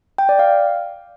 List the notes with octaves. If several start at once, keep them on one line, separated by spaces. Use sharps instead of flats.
G5
D5
F5